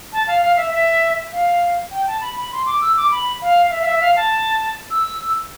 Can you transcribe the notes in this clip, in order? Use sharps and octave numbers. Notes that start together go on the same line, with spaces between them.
A5
F5
F5
E5
E5
F5
G5
A5
B5
B5
C6
D6
E6
D6
B5
F5
E5
F5
E5
F5
A5
E6